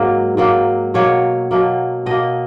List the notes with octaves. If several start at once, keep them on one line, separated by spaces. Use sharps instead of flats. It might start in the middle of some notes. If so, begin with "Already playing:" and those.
Already playing: G#2 F#3 A#3
G#2 F#3 A#3
B2 F#3 A#3 C#5
B2 F#3 A#3
B2 A#3 D#5